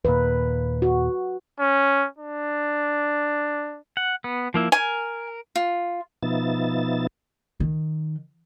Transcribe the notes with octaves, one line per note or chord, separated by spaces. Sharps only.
D#2 A#2 B4
F#4
C#4
D4
F#5
B3
F3 A#3 E4
A#4 G#5
F4
B2 F3 B3 D#4 E5 A6
D#3